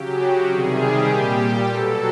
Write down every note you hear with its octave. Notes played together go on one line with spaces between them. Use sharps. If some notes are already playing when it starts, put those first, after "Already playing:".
Already playing: C#3 F#3 G4
F#4
C3 D#3 G3 G#4
G4
A#2 G3 G4
B2 F#3 A4